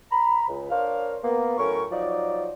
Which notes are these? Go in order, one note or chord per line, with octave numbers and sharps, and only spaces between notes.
A#5 B5
C#2
D4 A#4 C5 C#5 F5
A#3 B3
A2 F#3 C#4 A4 A#4 C#6
F3 F#3 D#4 F4 D5